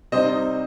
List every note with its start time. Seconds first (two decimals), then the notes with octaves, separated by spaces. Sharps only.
0.12 C3 G3 C4 D#4 C5 D#5